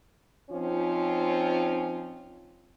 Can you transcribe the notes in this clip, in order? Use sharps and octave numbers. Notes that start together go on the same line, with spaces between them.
F3 C4 C#4 D#4 F4